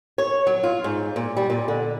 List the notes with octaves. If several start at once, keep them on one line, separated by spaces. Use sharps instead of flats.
C#5
F#3
F4
G#2
A#2
G3
A#2
D3